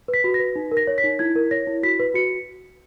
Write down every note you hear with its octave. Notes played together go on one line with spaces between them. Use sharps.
B4
B6
F#4
A#6
B4
D#4
A#4
A#6
C#5
B6
D#4
E4 G#6
A#4
C#5 A#6
E4
F#4 B6
B4
F#4 C#7